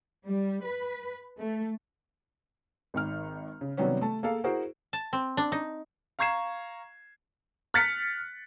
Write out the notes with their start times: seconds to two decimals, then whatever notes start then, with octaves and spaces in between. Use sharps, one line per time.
0.25 G3
0.64 B4
1.36 A3
2.94 G#1 D#3 F6
3.61 C#3
3.77 C3 D#3 F#3 G3 B3 C#4
4.01 A3 A5
4.23 A#3 G#4 A4 F5
4.44 E4 F#4 G#4 A#4 C5
4.93 A5
5.13 C4
5.37 D4
5.52 D#4
6.19 F5 A#5 C#6 G#6 C7 E7
7.74 F6 F#6 A6 B6 C#7